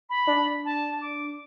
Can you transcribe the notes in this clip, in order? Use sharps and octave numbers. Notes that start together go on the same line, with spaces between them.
B5
D4 D5
A5
D6